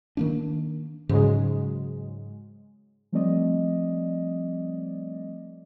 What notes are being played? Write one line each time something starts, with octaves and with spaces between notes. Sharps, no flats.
D#3 A#3 D4
G#2 C#3 F#3 G#3
F3 G3 A3 C4 D5 D#5